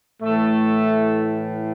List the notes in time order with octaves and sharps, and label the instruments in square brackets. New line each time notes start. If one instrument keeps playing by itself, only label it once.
[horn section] A2 E3 A3